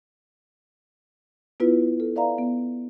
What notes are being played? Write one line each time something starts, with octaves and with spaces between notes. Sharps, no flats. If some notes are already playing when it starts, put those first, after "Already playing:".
B3 E4 F4 B4
F4 A4
B4 D5 E5 F5 A#5
B3